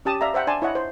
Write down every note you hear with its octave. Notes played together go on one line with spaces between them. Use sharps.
C#4 G4 A5 D#6
D5 E5 F5 A#5
C5 E5 F#5 G5
D4 D5 G#5 A5 C6
E4 C#5 D#5 F#5
C5